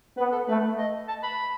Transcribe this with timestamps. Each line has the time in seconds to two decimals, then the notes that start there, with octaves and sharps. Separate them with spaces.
0.17 B3 B4
0.32 A4
0.47 A3 B4
0.78 D#5
1.08 A5
1.23 B5